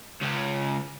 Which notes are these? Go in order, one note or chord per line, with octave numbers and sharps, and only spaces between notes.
C#2 C#3